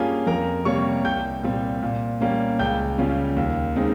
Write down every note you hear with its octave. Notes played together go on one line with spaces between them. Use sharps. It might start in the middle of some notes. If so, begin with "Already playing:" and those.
Already playing: G2 G3 A#3 C#4 F4 G4 G#4 G#5
F2 A#4 A#5
C3 G3 A#3 C#5 C#6
C2 G5 G6
A#2 G3 C4
A#2
G3 A#3 C#4
C#2 G5 G6
C#3 G3 C#4 F4
D#2
C#3 G#3 C4 D#4